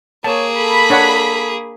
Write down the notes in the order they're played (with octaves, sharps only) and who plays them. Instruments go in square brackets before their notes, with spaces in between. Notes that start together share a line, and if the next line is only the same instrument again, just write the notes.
[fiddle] A#3 G#4 [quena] C#5 [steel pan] A5
[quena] A4 [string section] B5
[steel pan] D4 C#5 F#5